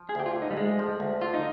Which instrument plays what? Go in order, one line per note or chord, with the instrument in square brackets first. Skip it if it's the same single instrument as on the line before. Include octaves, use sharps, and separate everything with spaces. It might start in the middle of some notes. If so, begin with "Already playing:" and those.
Already playing: [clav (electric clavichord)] F3
[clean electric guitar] G#4
[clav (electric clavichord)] D2 [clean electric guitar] G4
[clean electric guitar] F4
[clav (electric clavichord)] D3
[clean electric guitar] D#4
G3
[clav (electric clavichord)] D2 [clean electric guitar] G#3
[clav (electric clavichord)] F3
D2
[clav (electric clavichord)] D3 [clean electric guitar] F4
[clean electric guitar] D#4